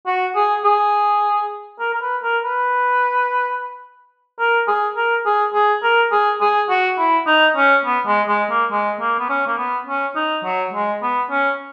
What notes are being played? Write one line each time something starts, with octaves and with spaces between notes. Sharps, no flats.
F#4
G#4
G#4
A#4
A#4
B4
A#4
B4
A#4
G#4
A#4
G#4
G#4
A#4
G#4
G#4
F#4
E4
D#4
C#4
B3
G#3
G#3
A#3
G#3
A#3
B3
C#4
A#3
B3
C#4
D#4
F#3
G#3
B3
C#4